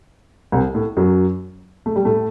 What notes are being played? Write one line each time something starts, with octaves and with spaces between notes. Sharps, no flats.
C2 C3
A2
F#2 F#3
A3
G3
A2 A3